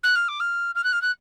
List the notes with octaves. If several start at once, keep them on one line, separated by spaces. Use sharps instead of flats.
F#6
F6
D6
F6
F6
F#6
F6
F#6